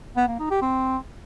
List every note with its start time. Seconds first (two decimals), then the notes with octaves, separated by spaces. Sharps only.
0.17 B3
0.28 A#3
0.39 D#4
0.51 G4
0.62 C4